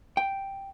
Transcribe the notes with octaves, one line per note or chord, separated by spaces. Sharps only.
G5